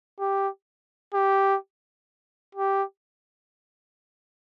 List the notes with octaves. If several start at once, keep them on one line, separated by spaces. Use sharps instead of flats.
G4
G4
G4